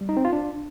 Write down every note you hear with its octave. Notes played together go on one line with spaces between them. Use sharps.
G3
D#4
C4
F4
D4